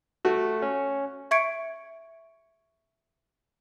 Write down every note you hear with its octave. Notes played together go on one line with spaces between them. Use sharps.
A3 F#4
C#4
E5 C#6 G#6 C#7 D7